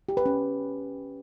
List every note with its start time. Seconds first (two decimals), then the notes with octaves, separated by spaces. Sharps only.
0.09 G4
0.17 B4
0.26 C#4